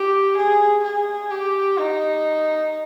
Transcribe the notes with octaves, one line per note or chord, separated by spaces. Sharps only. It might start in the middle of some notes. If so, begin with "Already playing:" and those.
Already playing: G4
G#4
G#4
G4
D#4